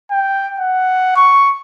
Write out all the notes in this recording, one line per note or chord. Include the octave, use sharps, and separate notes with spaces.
G5
F#5
C#6